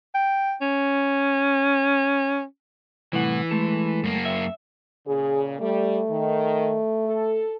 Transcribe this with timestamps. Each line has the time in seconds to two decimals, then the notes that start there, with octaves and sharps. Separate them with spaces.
0.15 G5
0.61 C#4
3.13 C2 A2 E3 F#5
3.51 G#3 A3 A4
4.04 F#2 A#3
4.25 E5
5.07 A#2 C#3 G#4
5.61 G3 A3
6.10 D#3
7.07 A4